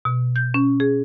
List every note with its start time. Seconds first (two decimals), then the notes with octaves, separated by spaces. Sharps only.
0.05 B2
0.36 G6
0.54 C#4
0.80 G#4